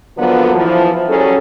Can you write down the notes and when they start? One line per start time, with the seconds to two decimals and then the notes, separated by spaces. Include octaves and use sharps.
0.17 D3 F3 F#3 A#3 B3
0.54 E3 F3
1.07 F#3 G3 C#4 G#4 A4